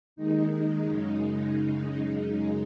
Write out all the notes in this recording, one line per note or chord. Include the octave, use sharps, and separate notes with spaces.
D#2 D#3 G#3 D#4
D#4
F#2 C#3 G#3